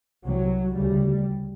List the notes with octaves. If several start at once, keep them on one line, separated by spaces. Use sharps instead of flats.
C2 C3 F#3
D2 C#3 G3